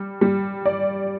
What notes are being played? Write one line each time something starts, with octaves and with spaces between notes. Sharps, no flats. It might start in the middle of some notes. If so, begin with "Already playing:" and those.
Already playing: G3
G3
D5